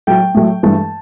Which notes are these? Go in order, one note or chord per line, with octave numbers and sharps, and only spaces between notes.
A2 F#3 A3 G5
A2 F#3 A3
G2 E3 A3 A5